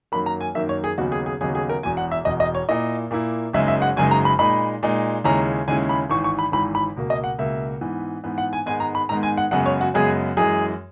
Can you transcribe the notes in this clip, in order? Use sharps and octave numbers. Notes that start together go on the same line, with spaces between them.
F#2 D#3 A#3 B5
A#5
G#5
F#2 D#3 A#3 E5
C#5
G#4
D#2 C#3 F#3 B3 D#4 F#4
G#4
G#4
D#2 C#3 F#3 B3 D#4 G#4
G#4
A#4
E1 E2 B2 G#5
F#5
E5
E1 E2 B2 D#5
D#5
C#5
A#2 A#3 E4 D#5
A#2 A#3 E4
F#1 F#2 C#3 G#3 D#4 E5
E5
F#5
F#1 F#2 C#3 G#3 D#4 G#5
A#5
B5
A#2 G#3 D#4 B5
A#2 G#3 D#4
D#2 C#3 G#3 C#4 E4 A#5
D#2 C#3 G#3 C#4 E4 G#5
B5
G#1 G#2 E3 C#6
C#6
B5
G#1 G#2 E3 B5
B5
C#2 B2 A#3
D#5
F#5
C#2 B2 A#3 E5
G#2 E3 B3
G#2 E3 B3
F#5
G#5
G#2 D#3 G#3 B3 G#5
A#5
B5
G#2 D#3 G#3 B3 A#5
G#5
F#5
F#2 C#3 G#3 B3 F#5
C#5
F#4
F#2 C#3 G#3 B3 G#4
F#2 E3 G#3 G#4